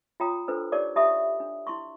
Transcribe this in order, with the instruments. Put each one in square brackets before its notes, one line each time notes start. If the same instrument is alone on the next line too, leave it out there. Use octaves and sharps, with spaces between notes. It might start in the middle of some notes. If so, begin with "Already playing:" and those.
[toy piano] F4 C#5 G5 A#5 D#6
D4 F4 A4 B4 C5
D#4 G4 A#4 C#5 D5 D6
G4 D#5 E5 A5 B5 D#6
D4
E4 C6 C#6